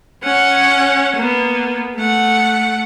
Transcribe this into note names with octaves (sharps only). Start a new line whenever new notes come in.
C#4 F#5
A#3 B3
A3 F#5